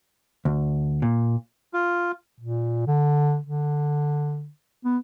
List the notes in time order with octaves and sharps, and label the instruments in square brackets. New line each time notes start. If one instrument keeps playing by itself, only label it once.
[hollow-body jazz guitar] D2
A#2
[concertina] F4
[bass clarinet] A#2
D3
D3
B3